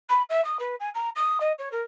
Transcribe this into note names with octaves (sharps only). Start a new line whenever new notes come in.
B5
E5
D#6
B4
G#5
A#5
D#6
D#5
C#5
A#4